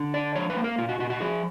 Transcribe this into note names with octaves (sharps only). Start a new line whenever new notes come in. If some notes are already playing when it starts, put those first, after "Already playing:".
Already playing: D3
D4 D5
F3 C#5
B4
A#3
A#4
A#2 F4
F#4
A#2 F#4
F#4
F3 G#4